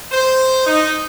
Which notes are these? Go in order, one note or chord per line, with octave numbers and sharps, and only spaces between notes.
C5
D#4